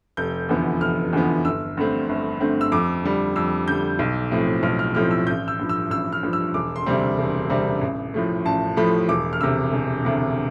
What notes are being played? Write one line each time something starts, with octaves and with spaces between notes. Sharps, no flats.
F1 G6
E2 D3 F3 B3
F1 F6
E2 D3 F3 B3
G1 E6
G2 D3 A3 C4
G1
G2 D3 A3 C4
E6
F2 D6
D3 G3
F2 E6
D3 G3 G6
B1
A2 F3 A3 C4
B1 F6
F6
A2 F3 A3 C4 F6
E6
A1 G6
E6
G2 F3
E6
A1 E6
F6
G2 F3
E6
E1 D6
C6
D2 C3 G3 C4
E1
D2 C3 G3 C4
A1
A2 F3 A3
A1 A5
A2 F3 A3 B5
E1 D6
F6
D2 C3 E6
E1
D2 C3